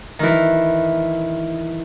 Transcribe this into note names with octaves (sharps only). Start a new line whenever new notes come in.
D#3 E3